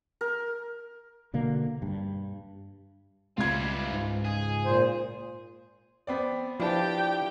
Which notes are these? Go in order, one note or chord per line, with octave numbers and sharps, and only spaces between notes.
A#4
B2 D3 A#3
G2
C#2 G3 F4 G#6
G#2
G#4
A#2 C5
B3 C4 D5
F3 D4 E4 G4 B4 G5 A5